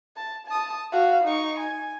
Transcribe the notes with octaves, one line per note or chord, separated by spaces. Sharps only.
A5
A5 D#6
F#4 F5
D#4 C#6
G#5